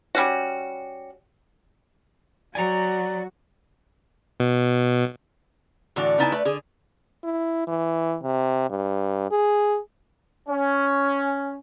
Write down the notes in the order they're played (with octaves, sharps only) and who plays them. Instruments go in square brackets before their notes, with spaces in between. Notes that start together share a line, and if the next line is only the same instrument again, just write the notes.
[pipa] G3 C#4 F#4
[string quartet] F#3 [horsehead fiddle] F#4 [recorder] D5 [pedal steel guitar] G#5 A#5
[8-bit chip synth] B2
[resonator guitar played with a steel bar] A2 D3 E3 D4 F#4
C#3 B3 D#4 E4 G#5 A5
A3 B4 D5
D3 G#4
[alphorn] E4
E3
C3
G2
G#4
[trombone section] C#4